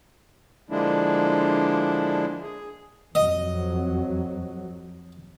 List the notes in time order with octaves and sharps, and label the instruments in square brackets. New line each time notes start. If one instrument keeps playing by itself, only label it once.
[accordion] D3 F3 G#3 A#3 D4 E4
G#4
[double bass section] F2 F#3 [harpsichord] D#5